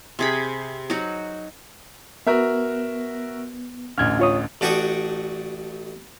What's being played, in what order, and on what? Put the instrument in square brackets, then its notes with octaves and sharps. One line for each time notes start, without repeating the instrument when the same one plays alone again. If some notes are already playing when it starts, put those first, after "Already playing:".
[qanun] C3 G#4 B5
F#3 D#4 F#4
[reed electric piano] B3 [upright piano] F#4 A#4 E5
[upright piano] A1 D2 [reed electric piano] F6 G#6
[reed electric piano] F4 C#5 D#6
[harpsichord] A1 D4 F#4 G4 C#6 D#6